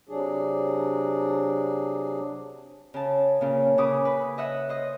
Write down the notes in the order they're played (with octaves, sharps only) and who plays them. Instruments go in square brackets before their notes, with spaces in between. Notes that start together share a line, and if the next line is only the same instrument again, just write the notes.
[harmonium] C3 F#3 D4 G#4
[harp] C#3 A5
A#2 C#3
C#3 C#4 B4 D6 D#6
B4
D#5 E5 F#5
C5 D#5